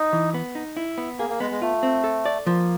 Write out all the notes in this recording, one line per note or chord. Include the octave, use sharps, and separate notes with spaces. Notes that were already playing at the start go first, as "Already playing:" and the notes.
Already playing: D#4
E3
B3
D#4
E4
B3
A#3 G#4
A#3
G#3 B3
G#3
A3 F4
C4
A4
D5
F3 A#3